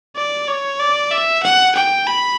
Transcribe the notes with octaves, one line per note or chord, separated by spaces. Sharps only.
D5
C#5
D5
E5
F#5
G5
B5